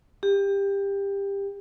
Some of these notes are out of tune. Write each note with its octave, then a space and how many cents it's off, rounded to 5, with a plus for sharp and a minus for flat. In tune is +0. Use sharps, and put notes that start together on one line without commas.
G4 +20